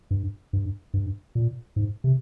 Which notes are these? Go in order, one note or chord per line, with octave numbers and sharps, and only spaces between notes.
G2
G2
G2
A#2
G#2
C3